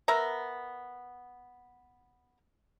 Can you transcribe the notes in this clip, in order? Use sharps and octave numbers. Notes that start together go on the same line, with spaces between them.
B3 A#4 E5 A#5